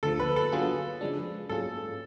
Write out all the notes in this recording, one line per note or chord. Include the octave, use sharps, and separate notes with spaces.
D2 D3 F3 A4
B4
A4
D3 F#3 B3 F4 G#4
C#3 F3 G#3 D4
G#2 F#3 C#4 F4 G#4 A4